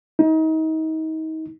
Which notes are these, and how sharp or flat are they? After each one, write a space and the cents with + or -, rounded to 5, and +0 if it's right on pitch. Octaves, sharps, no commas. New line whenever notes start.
D#4 +35